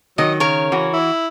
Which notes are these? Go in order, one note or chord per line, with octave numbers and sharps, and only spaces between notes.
D#3 F#3 D#5
C#3 A#4 C#5
E3 F#4
E4